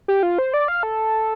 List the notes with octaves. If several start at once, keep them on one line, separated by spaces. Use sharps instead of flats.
G4
F4
C5
D5
F5
A4